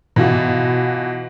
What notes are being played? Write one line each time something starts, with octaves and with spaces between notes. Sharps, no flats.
B2 E3 F4 F#4